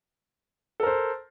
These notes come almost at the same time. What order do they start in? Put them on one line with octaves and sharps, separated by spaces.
A4 A#4 C5